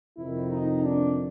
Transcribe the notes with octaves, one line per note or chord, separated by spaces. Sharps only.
F2 C3 D#3 E4
D#4
D4